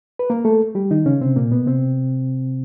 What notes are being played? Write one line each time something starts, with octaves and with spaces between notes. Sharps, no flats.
B4
A#3 A#4
A3 A4
G3 G4
D#3 D#4
C#3 C#4
C3 C4
A#2 A#3
B2 B3
C3 C4